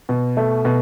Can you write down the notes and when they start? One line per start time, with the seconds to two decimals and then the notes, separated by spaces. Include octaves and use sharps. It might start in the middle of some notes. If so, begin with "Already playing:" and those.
0.09 B2
0.37 A3
0.65 B2